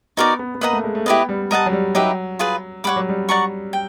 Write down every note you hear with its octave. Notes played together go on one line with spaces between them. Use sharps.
B3 D#4 F#4 A#4 D5
B3
B3
A#3 B4 D#5 F#5 A#5
A3
G#3
A3
B3 E4 G4 B4 D#5
G3
G3 A#4 D#5 F#5 A5
F#3
G3
F#3 D#4 G4 B4 E5
F4 G#4 B4
G3 C#5 F#5 B5 D6
F#3
G3
D5 F#5 A#5 C#6
G5